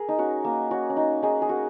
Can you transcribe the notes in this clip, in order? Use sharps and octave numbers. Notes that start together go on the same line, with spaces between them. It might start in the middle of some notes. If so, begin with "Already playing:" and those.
Already playing: G#4 A#4
D#4
C#4 F#4
A#3
C#4 F#4
C#4
D#4
D#4 G#4
G#4
F#4 A#4